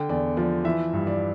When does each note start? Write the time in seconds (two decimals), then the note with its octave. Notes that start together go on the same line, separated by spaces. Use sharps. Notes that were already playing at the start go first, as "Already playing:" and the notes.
Already playing: D3 G5
0.09 E2 D5
0.37 F3 D5
0.65 E3 E5
0.93 G2
1.07 D5